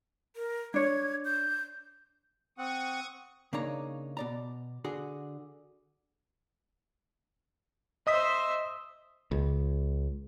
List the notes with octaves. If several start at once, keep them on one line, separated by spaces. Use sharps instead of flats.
A#4
D4 C#5 G#6
G6
C4 F#5 C#6 D#6
C#3 A#3 D4 D#4 C#5 A#5
B2 D5 A#5
D3 F#4 G#4
C5 D#5 E5 D#6 B6
C#2